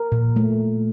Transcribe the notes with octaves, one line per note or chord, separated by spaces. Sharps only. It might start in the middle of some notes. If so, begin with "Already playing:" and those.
Already playing: A#4
A#2
A3